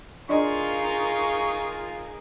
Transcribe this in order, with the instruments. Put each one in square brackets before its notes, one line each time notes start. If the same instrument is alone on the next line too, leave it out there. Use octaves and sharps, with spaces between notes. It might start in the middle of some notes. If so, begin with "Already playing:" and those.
[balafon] D4 D5 D#5 [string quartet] D#4 G#4 A#4 [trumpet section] F4 [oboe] C#6